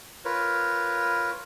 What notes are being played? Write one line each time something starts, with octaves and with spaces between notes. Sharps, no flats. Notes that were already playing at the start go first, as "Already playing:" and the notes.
F4 A#4 B4 C#5